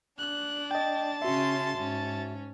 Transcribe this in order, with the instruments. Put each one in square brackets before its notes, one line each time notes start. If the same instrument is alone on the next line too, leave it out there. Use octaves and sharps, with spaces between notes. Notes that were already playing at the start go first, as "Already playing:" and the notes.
[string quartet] D4 [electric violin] F#6
[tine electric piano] D#5 G5 [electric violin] A5 A6
[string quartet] C#3 C#4 C6 [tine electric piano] F#4 E5
[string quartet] G#2 C#4